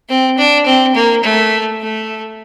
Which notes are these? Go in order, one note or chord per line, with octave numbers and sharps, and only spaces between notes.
C4
D4
C4
A#3
A3
A3